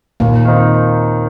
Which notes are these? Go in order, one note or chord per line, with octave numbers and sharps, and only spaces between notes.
D#2 A#2 A#3
D#3 C4 D#4